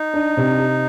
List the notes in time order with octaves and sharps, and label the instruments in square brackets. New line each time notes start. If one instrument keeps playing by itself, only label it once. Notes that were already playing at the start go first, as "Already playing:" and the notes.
Already playing: [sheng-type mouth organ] D#4
[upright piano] D4
C3
G4